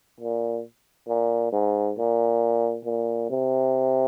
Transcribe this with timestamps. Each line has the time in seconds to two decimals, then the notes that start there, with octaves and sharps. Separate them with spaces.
0.20 A#2
1.08 A#2
1.52 G#2
1.97 A#2
2.85 A#2
3.30 C3